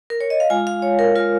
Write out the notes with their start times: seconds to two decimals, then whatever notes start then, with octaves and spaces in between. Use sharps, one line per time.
0.10 A#4
0.21 C#5
0.30 D#5
0.40 F5
0.50 G#3 F4 G#5
0.67 F5
0.82 C#5
0.99 A#4
1.16 G#3 F4 A#4